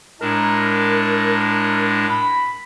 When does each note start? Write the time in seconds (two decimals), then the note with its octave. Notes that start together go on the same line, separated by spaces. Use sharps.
0.21 A2 G#3 D4 A#4
2.10 B5